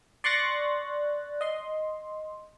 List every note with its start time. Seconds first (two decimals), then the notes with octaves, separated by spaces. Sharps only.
0.24 D5 C6 C#6 F#6 A6 A#6
1.41 D#5 C6